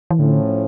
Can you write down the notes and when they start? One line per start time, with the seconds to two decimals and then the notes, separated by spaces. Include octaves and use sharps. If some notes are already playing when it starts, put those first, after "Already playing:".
0.11 E3
0.19 A2 D3 F3 C#4